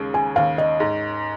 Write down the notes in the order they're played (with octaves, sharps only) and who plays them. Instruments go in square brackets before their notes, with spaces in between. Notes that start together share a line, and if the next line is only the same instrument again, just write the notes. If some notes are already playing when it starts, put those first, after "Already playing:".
Already playing: [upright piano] D#2 C#3 G#3
[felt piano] G#5
[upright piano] D#2 [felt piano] F5
[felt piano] D#5
[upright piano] G#2